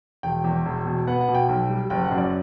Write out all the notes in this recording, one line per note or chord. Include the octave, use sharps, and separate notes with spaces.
E1 G5
E2
E1
B2
B3 F#5
F#5
B2
G5
B1
G3
F#1 G5
F#5
F#2
D5